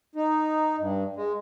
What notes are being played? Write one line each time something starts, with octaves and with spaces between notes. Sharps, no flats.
D#4
G2
G#3